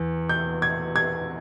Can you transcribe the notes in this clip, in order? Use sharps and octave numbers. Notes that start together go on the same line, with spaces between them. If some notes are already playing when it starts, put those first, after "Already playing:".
Already playing: E2
G6
G#6
G#6